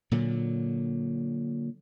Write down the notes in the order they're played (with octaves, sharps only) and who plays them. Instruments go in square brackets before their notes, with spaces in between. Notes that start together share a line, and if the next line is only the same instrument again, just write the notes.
[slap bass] A#2 D3 F#3